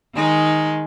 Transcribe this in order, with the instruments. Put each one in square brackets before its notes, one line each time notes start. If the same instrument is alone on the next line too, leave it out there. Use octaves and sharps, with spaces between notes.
[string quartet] D#3 G#3 D#4